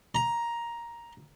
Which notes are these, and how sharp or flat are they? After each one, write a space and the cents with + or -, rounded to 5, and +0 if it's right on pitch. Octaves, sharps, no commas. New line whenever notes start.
A#5 +10